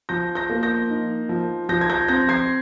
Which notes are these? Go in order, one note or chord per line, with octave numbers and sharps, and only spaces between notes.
F3 G6 A#6
G6 A#6
A#3
G6 A#6
D#4
F3
F3 G6 A#6
G#6
G6 A#6
C4 G6 A#6
G#6 C7